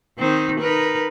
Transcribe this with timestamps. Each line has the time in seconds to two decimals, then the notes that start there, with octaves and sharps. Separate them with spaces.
0.18 D#3 C4 D#4
0.59 D#4 A#4 B4